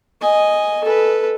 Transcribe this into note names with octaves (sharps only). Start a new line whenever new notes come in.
D#5 G#5
A4 B4